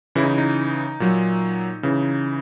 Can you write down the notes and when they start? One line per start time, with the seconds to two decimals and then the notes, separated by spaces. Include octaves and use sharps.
0.15 C#3 E3 E4
0.23 D#4
0.38 D#4
1.00 A#2 F#3
1.83 C#3 E3